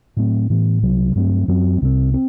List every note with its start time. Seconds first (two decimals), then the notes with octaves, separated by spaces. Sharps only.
0.17 A2 F#3 A3 C4
0.50 A2 E3 B3
0.82 C2 C3 F#3
1.15 G2 F#3 A3 C4
1.48 F#2 F#3 C4
1.81 C2 C3 F#3 C4
2.14 C4